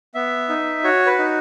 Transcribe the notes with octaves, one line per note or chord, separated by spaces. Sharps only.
B3 E5
D#4
F#4 C#5
B4
D#4